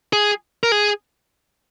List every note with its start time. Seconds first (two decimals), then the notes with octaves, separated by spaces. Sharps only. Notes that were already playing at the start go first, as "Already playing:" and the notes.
0.13 G#4
0.63 A#4
0.72 G#4